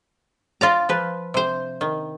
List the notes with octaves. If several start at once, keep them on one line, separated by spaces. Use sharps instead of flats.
F4 D5 A#5
F3 B4
C3 C5
D#3